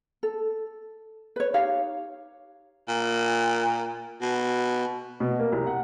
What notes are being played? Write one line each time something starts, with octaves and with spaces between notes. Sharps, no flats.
A4
B4 C#5
D#4 G4 C#5 F5
A#2
B2
B2
A#3
C2
F#5